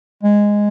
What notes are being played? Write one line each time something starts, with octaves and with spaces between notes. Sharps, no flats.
G#3